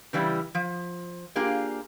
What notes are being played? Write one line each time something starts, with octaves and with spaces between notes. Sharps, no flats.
C#3 E3 G3 E4
F3
A#3 D4 F4 G4 G#4